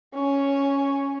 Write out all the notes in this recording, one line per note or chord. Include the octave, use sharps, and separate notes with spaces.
C#4